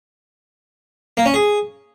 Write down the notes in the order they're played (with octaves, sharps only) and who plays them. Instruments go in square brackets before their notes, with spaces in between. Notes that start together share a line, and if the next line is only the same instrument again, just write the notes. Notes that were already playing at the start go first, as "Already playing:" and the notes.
[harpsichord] A#3
C#4
G#4